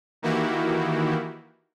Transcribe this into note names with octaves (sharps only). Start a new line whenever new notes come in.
D#3 E3 A#3 E4 F#4 G4